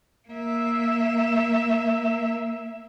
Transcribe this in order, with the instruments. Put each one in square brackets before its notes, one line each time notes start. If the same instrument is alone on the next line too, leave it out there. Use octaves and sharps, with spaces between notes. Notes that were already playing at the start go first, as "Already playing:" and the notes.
[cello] A#3 E5